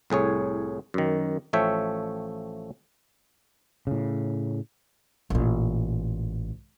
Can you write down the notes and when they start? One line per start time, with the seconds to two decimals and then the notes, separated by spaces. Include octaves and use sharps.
0.10 C2 A2 G#4 C#5
0.94 F#2 D#3
1.53 A1 F3 A3 C#5 E5 G5
3.87 A2 C#3
5.30 A1 A#2